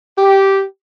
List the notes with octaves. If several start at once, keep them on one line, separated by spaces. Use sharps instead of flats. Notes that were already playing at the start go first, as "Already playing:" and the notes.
G4